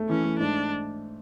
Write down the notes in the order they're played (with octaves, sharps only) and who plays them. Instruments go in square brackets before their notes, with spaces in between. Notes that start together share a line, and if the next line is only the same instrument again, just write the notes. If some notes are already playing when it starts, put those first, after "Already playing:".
Already playing: [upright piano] A3
[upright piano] E3 [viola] C#4
[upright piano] A3
[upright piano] G#2 [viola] D4